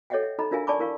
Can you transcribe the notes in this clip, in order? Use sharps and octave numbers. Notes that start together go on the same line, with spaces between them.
A4 C#5 D#5 E5 F#5 G5
E5
D#4 A4 D#5 A#5 B5
D4 F4 A#4 E5 F5 G#5
D5 G#5 A5 B5 C#6 D6
E4 A#4 F5 C#6